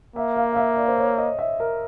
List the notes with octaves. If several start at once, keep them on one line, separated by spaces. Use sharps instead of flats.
A#3 E5
F5
F5
E5
D5
C5
C#5
D#5
E5
A#4